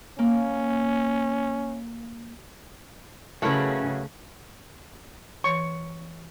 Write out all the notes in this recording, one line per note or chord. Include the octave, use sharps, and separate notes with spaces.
A#3 C#4
C#3 F#3 A3 C#4 E4 A#4 B4 F#5
E3 C#5 C#6